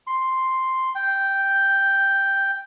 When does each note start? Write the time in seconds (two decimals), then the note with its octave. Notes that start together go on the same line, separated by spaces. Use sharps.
0.07 C6
0.95 G5